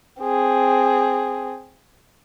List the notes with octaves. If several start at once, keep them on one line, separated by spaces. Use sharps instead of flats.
C4 G#4